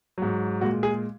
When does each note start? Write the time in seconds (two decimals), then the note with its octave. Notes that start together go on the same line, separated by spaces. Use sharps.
0.18 G#2 F#3
0.61 A#2 G#3 F#4
0.83 G#4